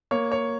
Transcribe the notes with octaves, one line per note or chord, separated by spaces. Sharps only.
A#3 C#5
C#5